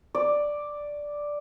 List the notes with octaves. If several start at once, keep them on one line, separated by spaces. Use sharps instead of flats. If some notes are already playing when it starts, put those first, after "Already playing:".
D5